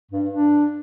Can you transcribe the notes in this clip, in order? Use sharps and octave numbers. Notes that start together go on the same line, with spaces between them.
G2
D4